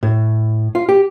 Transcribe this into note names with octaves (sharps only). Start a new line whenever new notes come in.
A2
F4
G4